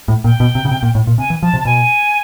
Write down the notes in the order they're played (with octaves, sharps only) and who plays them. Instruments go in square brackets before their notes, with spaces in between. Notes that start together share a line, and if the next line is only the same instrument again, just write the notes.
[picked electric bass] A2
[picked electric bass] A#2 [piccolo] G5
[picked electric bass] B2
C3
C#3
C3
A#2
A2
A#2
[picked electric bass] C3 [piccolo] G#5
[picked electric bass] E3
[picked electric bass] F3 [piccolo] A5
[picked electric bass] C3
[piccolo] A5
[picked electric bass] B2 [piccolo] G#5